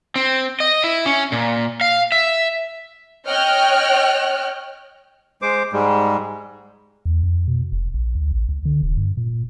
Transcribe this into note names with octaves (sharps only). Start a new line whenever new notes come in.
C4
D#5
E4
C#4
A#2
F5
E5
C#5 D#5 G5 F6 F#6
G#3 C5 D6
G#2 G3 G#3
E2
F2
B2
F1
A#1
D2
A1
C#2
D3
D#1
G2
A#2